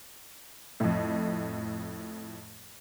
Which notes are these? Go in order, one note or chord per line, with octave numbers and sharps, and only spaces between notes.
F2 A2